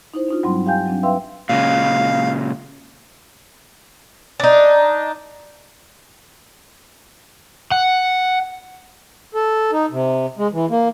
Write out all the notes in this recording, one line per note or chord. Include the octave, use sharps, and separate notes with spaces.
D#4 E4 C5
D4 D#4 F4
G2 F#3 G3 C4 C6
G4 F5 G5 G#5 G6
F#3 C4 D4
B4 E5 F5 G5 C6 E6
A#2 C#3 G#3 F5
D4 D#4
F#5
A4
D#4
C3
G#3
E3
A#3